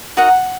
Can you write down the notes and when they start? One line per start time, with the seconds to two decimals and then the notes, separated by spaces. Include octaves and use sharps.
0.17 D#4 F#4 A#4 F#5